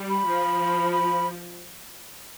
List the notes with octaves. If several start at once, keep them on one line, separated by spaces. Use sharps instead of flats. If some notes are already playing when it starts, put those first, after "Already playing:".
Already playing: G3
B5
F3
B5